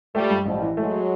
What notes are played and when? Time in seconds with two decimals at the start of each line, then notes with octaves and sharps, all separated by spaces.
0.15 F3 G3 A3
0.30 G2
0.46 A1 F3 G3
0.62 E3
0.77 F#3 G#3 A3